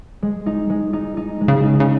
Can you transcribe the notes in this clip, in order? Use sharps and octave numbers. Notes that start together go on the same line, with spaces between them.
G#3
D#4
G#3
D#4
D#4
G#3
C#3
D#4
C#3